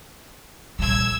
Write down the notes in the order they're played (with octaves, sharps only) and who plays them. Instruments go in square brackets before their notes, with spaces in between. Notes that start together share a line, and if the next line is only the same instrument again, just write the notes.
[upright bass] A#1 G3 [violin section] E6 G#6